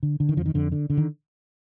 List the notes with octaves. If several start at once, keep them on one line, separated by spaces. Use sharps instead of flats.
D3
D3
D#3
F2 F3
D#3
F2 D3
D3
D3
D#3